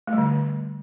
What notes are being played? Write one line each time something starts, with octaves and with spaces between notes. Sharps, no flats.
A3
G3
D3